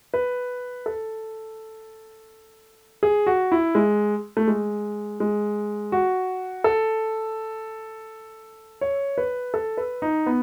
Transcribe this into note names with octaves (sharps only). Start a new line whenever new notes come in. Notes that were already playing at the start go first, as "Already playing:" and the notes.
B4
A4
G#4
F#4
E4
G#3
A3
G#3
G#3
F#4
A4
C#5
B4
A4
B4
D#4
B3